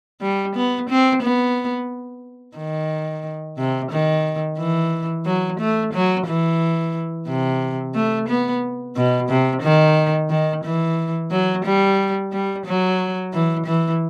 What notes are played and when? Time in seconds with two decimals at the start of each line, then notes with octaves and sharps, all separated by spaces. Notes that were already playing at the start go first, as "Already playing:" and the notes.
0.22 G3
0.56 B3
0.90 C4
1.22 B3
2.57 D#3
3.58 C3
3.91 D#3
4.59 E3
5.26 F#3
5.60 A3
5.94 F#3
6.27 E3
7.28 C3
7.95 A3
8.29 B3
8.96 B2
9.30 C3
9.63 D#3
10.30 D#3
10.64 E3
11.32 F#3
11.65 G3
12.32 G3
12.66 F#3
13.33 E3
13.67 E3